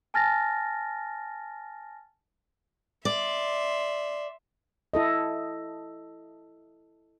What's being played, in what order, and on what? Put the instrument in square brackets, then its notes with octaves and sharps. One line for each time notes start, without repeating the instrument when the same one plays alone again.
[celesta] G#5 A5 F6 A6 A#6
[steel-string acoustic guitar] D5 [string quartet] E5 C6
[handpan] E4 A4 D#5